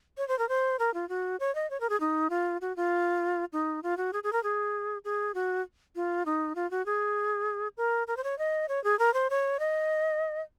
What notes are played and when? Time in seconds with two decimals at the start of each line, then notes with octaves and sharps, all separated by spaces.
0.18 C#5
0.28 C5
0.39 A#4
0.49 C5
0.79 A#4
0.94 F4
1.09 F#4
1.40 C#5
1.55 D#5
1.70 C#5
1.81 A#4
1.89 G#4
2.00 D#4
2.30 F4
2.61 F#4
2.77 F4
3.53 D#4
3.83 F4
3.97 F#4
4.13 G#4
4.24 G#4
4.33 A#4
4.43 G#4
5.05 G#4
5.34 F#4
5.96 F4
6.26 D#4
6.55 F4
6.71 F#4
6.86 G#4
7.77 A#4
8.07 A#4
8.17 C5
8.24 C#5
8.39 D#5
8.69 C#5
8.84 G#4
8.99 A#4
9.14 C5
9.30 C#5
9.60 D#5